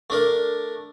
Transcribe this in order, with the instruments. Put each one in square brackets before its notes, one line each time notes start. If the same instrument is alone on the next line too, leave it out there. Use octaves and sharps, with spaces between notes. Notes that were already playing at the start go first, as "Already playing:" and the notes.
[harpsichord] A3 D4 A#4